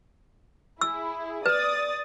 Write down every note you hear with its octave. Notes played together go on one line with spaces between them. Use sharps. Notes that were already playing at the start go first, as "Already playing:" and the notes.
E4 G#4 E6
B4 D5 D#6 A6